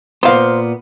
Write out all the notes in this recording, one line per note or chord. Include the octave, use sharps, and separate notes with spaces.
A#2 A#3 B3 C5 F5